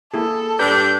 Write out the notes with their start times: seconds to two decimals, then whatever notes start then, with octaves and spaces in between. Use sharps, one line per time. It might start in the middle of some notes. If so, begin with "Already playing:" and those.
0.14 A#3 E4 G#4 A4
0.59 G2 D4 G4 B4 A#5 G6